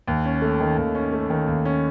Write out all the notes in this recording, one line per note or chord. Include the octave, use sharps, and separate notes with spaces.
D#2
C#4
A3
D#3
D#2
C#4
A3
D#3
D#2
C#4